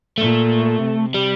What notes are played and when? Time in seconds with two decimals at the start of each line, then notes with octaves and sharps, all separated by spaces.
0.18 A#2 A3
0.83 C3
1.14 G3